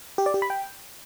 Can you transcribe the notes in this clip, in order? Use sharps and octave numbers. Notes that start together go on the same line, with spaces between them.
G4
D5
G4
B5
G5